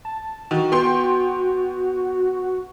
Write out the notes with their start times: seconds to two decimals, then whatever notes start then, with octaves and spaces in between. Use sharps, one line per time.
0.05 A5
0.51 D#3 F#4
0.72 B3 G5 C6